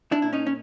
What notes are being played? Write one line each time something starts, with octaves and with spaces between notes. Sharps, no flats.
D4 E4
A#2 E4
C#4 D#4
C#4